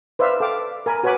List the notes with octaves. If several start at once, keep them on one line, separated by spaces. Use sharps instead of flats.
B4 C5 D5 E5 F5
A4 F5 G5 D6
A#4 G#5 B5
F#4 B4 C#5 G#5 B5 D6